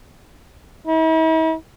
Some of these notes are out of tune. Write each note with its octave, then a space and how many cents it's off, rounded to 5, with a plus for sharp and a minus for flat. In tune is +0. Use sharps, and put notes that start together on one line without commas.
E4 -45